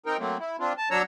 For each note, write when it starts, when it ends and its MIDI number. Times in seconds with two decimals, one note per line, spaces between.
0.06 0.17 60
0.06 0.17 63
0.06 0.17 70
0.06 0.17 79
0.19 0.37 54
0.19 0.37 57
0.19 0.37 58
0.19 0.37 60
0.40 0.57 64
0.60 0.73 60
0.60 0.73 62
0.60 0.73 65
0.78 0.89 81
0.91 1.02 54
0.91 1.02 62
0.91 1.02 73
0.91 1.02 82
0.91 1.02 88